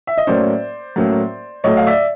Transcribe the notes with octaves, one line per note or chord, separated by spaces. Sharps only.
E5
D#5
A2 F#3 A#3 C#4 C5 D5
A2 F#3 A#3 C#4
A2 F#3 A3 C#5 D#5
F5
D5 E5